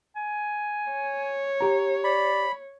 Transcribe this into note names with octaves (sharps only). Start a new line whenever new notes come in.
G#5
C#5
G4 A#5
D5 B5